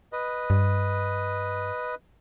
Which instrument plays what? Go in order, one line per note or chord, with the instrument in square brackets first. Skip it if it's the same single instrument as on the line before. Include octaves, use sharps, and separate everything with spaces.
[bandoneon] B4 D#5
[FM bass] G2